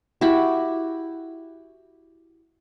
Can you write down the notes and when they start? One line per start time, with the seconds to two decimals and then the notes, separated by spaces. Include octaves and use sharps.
0.21 E4 F#4 G4 B5